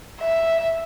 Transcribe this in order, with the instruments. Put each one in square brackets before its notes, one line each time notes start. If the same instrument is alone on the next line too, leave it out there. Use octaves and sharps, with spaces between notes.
[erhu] E5